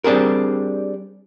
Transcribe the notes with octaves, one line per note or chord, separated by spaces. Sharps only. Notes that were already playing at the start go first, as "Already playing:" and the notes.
G3 C4 D4 G#4 A#4